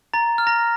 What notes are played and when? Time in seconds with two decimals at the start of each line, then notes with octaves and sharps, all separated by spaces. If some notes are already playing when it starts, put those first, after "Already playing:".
0.14 A#5 A6
0.38 F6
0.47 A#5 A#6